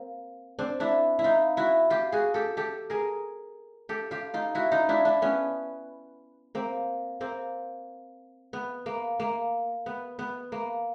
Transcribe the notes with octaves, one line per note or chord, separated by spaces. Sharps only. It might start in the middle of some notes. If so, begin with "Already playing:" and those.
Already playing: A#3 C4
C4 D4
D4 E4
E4
D#4 F4
E4 F#4
F4 G4
F#4 G#4
G4 A4
G4 A4
G#4 A#4
G4 A4
F4 G4
D#4 F4
E4 F#4
D#4 F4
D4 E4
D4 E4
B3 C#4
A#3 C4
A#3 C4
B3
A#3
A#3
B3
B3
A#3